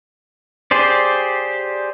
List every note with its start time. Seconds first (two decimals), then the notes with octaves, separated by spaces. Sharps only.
0.71 G4 G#4 C5 D5